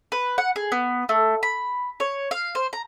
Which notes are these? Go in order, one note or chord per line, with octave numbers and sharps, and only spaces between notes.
B4
F#5
G#4
B3
A3
B5
C#5
F5
C5
A#5